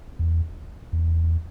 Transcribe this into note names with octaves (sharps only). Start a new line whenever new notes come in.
E2
E2